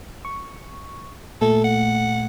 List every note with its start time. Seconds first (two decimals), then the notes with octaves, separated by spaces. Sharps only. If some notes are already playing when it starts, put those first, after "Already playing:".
0.25 C#6
1.41 A#2 A3 A4
1.64 F#5